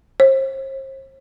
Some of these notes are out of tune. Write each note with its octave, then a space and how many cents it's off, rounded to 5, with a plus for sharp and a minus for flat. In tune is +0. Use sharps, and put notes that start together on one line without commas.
C5 +40